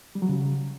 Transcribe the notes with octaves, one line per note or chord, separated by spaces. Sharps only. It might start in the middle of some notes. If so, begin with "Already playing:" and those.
G3
F#3
C#3